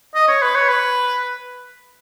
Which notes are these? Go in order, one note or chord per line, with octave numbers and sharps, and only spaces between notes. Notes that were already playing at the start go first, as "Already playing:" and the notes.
D#5
C#5
B4
C#5
B4